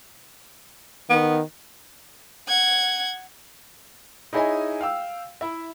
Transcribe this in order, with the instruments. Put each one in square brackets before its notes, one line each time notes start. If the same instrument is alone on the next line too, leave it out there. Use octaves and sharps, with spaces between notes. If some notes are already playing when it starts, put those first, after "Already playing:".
[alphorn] D#3 [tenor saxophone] B3
[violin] F#5 G#6
[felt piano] D#4 E4 G#4 C#5 D#5 G#5
F5 G5 E6
E4 E5